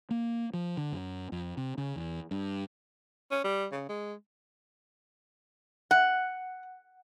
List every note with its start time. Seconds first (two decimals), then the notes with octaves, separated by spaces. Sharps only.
0.11 A#3
0.53 F3
0.77 D3
0.92 F#2
1.32 F2
1.57 C3
1.78 C#3
1.96 E2
2.31 G2
3.31 C#4
3.44 G3
3.72 C#3
3.89 G#3
5.91 F#5